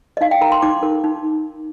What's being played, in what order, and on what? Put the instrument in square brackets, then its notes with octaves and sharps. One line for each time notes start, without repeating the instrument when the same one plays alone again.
[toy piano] D#5
D#4 F5
G5
A#4 A#5
C6
D#4 D6
A#4
D#4